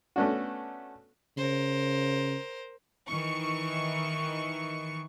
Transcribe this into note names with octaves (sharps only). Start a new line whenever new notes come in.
A3 B3 C#4 D4 F#4
C#3 A#4 C5
D#3 E3 C#6